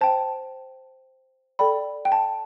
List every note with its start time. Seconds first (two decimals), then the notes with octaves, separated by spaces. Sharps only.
0.01 C5 G5 A5
1.59 A4 D5 G5 B5
2.05 G5
2.12 A5